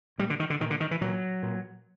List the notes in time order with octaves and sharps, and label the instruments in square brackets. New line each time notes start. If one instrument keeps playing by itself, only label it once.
[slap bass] A#2 G3
D3
D#3
D3
A#2 D#3
D3
D#3
E3
A#2 F#3
A#2